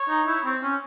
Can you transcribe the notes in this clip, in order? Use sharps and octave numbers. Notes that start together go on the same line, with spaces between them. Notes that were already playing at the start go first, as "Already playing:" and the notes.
Already playing: C#5
D#4
E4
C4
C#4